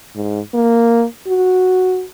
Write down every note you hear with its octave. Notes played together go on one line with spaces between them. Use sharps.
G#2
A#3
F#4